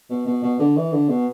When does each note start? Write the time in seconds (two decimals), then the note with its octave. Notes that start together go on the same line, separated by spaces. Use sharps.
0.10 B2
0.26 B2
0.43 B2
0.59 D3
0.76 E3
0.92 D3
1.09 B2